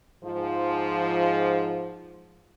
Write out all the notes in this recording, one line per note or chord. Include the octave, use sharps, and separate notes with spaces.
G#2 F3